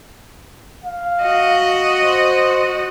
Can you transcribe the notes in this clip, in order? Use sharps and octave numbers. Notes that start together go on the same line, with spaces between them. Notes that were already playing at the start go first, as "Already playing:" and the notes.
F5
F#4 D#5
C5